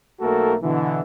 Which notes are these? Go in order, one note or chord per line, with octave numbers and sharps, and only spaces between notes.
B1 A3 A#3 F#4 A4 A#4
B2 D3 E3